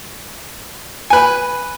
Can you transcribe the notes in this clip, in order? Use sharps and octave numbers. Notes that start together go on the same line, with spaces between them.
B4 G#5